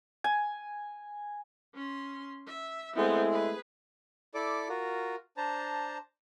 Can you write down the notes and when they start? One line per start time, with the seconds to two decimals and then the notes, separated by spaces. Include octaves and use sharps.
0.24 G#5
1.74 C#4 C6
2.47 E5
2.96 G#3 A3 B3 C4 E4
3.30 G#4 B4
4.34 E4 A4 D5 D6
4.69 F4 F#4 A#4
5.37 D4 C5 A5 A#5